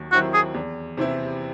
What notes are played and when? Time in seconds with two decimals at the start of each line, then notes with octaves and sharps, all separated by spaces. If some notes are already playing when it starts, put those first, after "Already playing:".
Already playing: D#2 D#3 F#3
0.12 D#3 F#3 C4 E4 F#4
0.34 G#4
0.54 E2
0.97 C3 E3 C4 E4